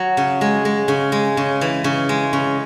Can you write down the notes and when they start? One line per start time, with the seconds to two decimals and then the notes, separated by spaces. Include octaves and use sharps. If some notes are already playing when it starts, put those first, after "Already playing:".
Already playing: F#3
0.17 C#3
0.41 G#3
0.65 G#3
0.88 C#3
1.12 G#3
1.37 C#3
1.61 E3
1.84 C#3
2.09 G#3
2.33 C#3